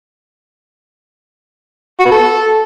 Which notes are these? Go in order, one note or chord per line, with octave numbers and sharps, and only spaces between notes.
F#4
B3
A4